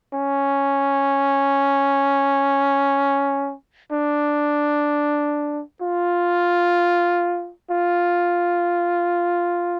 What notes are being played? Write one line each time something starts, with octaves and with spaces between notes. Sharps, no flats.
C#4
D4
F4
F4